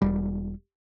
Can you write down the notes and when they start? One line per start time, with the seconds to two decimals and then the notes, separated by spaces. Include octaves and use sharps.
0.02 E1 G3